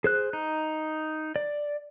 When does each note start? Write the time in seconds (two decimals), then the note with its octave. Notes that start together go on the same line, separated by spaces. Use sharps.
0.04 G#4 C5 F#6
0.33 D#4
1.36 D5